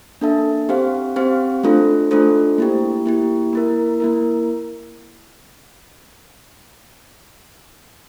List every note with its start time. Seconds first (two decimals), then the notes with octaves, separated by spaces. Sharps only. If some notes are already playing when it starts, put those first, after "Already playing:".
0.21 A#3 D4 A4 E5 A5
0.69 C4 G4 C5 F5
1.16 C4 G4 C5 F5
1.63 A3 D4 F4 A4 C5
2.11 A3 D4 F4 A4 C5
2.58 A#3 E4 G4
3.06 A#3 E4 G4
3.53 A#3 E4 A#4
4.00 A#3 E4 A#4